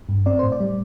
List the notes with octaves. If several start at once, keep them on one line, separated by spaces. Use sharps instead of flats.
G2
C4 D5
A2 C5
D5
G3